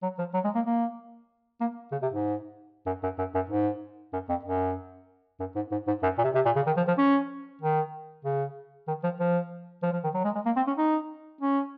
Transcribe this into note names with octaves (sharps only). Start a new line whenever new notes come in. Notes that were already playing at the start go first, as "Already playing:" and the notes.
F#3
F3
F#3
G#3
A#3
A#3
A#3
C#3
C3
G#2
F#2
F#2
F#2
F#2
G#2
F#2
F2
F#2
F#2
G#2
G#2
G#2
F#2
A#2
C3
C3
A#2
C#3
D#3
F3
F3
C#4
D#3
C#3
D#3
F3
F3
F3
F3
D#3
F#3
G#3
G#3
A#3
C4
C#4
D#4
C#4